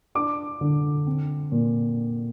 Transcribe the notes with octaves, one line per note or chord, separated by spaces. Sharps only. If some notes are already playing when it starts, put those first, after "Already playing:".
D4 D6
D3
C4
A#2